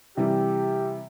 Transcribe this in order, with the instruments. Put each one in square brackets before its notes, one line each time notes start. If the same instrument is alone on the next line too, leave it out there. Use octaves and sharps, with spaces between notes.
[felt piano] C3 E3 G3 [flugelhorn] G4